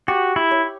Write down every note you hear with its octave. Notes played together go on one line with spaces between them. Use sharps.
F#4 G4
E4
C#5